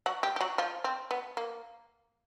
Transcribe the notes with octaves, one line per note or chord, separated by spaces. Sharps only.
F#3 F#4
G3 G4
G4
F#3 F#4
F3 F4
C4
B3
A#3